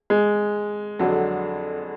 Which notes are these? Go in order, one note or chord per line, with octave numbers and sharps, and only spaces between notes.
G#3
F2 D3 F#3